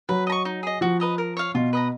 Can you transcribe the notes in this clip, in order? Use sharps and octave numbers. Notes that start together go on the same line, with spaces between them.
F#3 B4
D#5 A#5
C#6
D#4
G#4 D#5
F3 F#4
B4 D#5 A#5
A#4
C#5 F5
B2 F4
B4 D#5 A#5